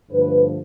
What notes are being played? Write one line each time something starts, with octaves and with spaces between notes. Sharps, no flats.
G2 D3 F3 A3 B4